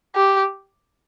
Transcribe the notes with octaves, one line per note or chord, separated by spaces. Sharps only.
G4